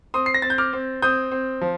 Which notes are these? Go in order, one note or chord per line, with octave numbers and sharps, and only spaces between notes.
C4 C6 D#6
C7
A#6
C4 A6
G6
D6 F6
C4
C4 D#6 G6
C4
F3